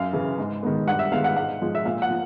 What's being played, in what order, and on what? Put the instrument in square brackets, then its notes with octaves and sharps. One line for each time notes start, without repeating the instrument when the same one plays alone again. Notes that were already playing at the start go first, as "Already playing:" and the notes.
Already playing: [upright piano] F#2 F5
C#3 E3
G#2
D#3 G#3 B3
G2 F#5
E5
D#3 G#3 B3 F5
F#5
G#2 F#5
F3 G#3
E5
A#2 F5
F#5
F3